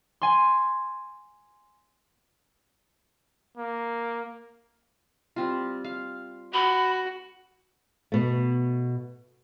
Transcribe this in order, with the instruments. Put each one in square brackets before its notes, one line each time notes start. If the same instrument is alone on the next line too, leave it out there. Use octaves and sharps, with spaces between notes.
[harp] G#5 C6
[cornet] A#3
[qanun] G3 C4 F4
F5
[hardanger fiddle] F#4 [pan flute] B5
[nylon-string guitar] B2 A3